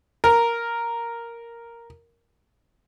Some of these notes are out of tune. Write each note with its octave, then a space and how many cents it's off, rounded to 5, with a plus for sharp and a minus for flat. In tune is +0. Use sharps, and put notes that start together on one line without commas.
A#4 +0